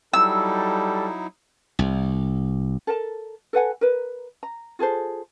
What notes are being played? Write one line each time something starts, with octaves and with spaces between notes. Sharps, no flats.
F#3 G3 D#4 E4 A4 E6
C2
A4 A#4 A5
A4 B4 F#5 G#5
A#4 B4
A#5
F4 G#4 A4 C5